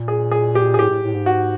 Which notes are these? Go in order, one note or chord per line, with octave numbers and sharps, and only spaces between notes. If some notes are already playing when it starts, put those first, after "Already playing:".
Already playing: A#2
G#4
G#4
G4
G#4
A2 G4
A2
A2
G#2
F#4